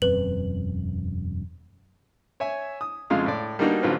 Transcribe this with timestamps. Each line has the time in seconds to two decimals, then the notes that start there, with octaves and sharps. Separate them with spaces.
0.02 E1 F#2 C4 B4 F#7
2.40 C#5 E5 G#5
2.81 D#6
3.10 F2 C#3 G#3 E4 F4 F5
3.26 A2 D5
3.59 G3 A#3 B3 D4 D#4 F#4
3.83 A1 D3 F#3 C4 F4 B4